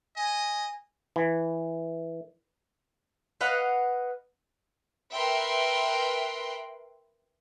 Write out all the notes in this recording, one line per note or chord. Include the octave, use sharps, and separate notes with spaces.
D#5 G#5
E3
B4 D#5 F5 F#5
A#4 B4 E5 G5 B5 C6